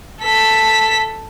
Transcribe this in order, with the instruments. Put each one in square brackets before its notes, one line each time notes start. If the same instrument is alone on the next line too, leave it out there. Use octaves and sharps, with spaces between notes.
[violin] A4 B6